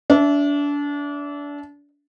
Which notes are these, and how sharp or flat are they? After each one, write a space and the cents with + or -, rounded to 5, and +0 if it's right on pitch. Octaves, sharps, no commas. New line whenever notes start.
D4 -30 E5 +0